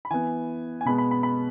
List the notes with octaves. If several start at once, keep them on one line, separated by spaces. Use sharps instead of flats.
B5
E3 B3 G#5
G#5
B2 G#3 B3 B5
B5
B5
B5